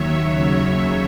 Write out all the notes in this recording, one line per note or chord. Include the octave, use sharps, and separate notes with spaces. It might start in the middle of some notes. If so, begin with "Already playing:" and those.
Already playing: D#2 D#3 F#3 C#5 E5
D#2 C#3 F#3